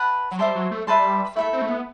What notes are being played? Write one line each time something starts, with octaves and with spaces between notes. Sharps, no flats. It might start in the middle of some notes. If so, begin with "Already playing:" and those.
Already playing: B4 F#5 A5
F#3
G3 C5 E5 A5 C6
F#3
A3
G3 B4 E5 A5 C6
A3 E4 A4 E5
C4
A3
B3